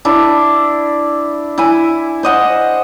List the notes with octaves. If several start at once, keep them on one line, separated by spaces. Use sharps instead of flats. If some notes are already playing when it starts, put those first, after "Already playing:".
D4 E4
E4 G#5
C5 D#5 F#5